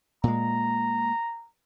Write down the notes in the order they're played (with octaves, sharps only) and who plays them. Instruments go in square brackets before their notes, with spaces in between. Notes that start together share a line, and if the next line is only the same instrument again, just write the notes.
[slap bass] A#2 G#3 [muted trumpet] A#5